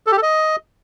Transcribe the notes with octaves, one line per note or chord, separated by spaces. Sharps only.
A4
G4
A4
D#5